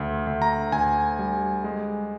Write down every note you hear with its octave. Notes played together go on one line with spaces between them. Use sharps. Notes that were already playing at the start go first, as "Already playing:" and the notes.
Already playing: D2
D2
A#5
D2 G#5
G3
G#3